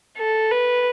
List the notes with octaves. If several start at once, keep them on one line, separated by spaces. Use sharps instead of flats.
A4
B4